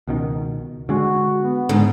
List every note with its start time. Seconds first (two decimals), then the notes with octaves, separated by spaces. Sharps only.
0.07 C#2 B2 D#3
0.89 D3 G#3 F#4
1.41 B3
1.69 G#2 D3